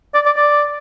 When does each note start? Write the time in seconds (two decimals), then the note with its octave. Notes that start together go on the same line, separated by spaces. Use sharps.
0.15 D5
0.26 D5
0.37 D5